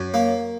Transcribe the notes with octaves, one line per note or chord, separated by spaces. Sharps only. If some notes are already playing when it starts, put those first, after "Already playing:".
Already playing: F#2
A#3